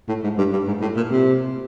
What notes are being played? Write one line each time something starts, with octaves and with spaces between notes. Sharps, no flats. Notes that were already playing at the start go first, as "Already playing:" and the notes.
A2
G#2
G2
G2
G#2
A2
A#2
C3